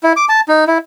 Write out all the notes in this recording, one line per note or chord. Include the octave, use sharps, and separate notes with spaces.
E4
D6
A5
D#4
E4